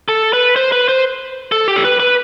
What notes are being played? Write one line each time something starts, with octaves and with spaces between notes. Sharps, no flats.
A4
B4
C5
B4
C5
A4
G4
A4
B4
B4